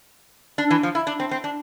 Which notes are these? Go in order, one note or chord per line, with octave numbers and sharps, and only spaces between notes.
D4
E3
F3
E4
D4
C4
C4
D4